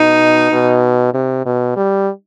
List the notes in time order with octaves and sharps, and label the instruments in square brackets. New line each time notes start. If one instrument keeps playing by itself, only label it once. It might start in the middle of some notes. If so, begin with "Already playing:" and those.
Already playing: [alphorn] B2 [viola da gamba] D#4
[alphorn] B2
C3
B2
G3